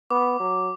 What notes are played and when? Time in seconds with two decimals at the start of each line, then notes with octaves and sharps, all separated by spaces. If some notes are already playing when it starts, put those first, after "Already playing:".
0.10 B3 D6
0.40 F#3